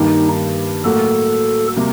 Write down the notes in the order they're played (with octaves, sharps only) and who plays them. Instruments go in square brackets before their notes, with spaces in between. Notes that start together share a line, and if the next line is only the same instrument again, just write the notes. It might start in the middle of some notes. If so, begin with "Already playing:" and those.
Already playing: [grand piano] G2 D#3 G3 A#3 [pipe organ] D#4
[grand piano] A2 F#3 A#3 F#4 [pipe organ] A4
[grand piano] C3 G3 A#3